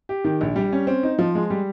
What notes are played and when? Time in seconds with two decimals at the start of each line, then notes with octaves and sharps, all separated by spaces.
0.09 G4
0.24 D#3
0.41 A#1
0.56 G3
0.73 C#4
0.87 C4
1.03 D#4
1.19 F3
1.35 G#3
1.50 G3